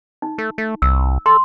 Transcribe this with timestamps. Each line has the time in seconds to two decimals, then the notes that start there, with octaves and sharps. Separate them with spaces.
0.22 D#4
0.38 A3
0.58 A3
0.82 C2 E6
1.26 A4 C6